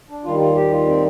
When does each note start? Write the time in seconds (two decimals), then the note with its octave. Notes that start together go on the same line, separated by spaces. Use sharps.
0.09 D4
0.24 D#2 D#3 G3 F4
0.40 F4
0.55 G4
0.71 F4
0.87 C4